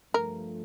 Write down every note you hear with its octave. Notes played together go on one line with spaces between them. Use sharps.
G2 F3 A3 A#4